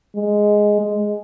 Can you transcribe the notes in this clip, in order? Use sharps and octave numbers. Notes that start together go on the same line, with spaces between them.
G#3
G#3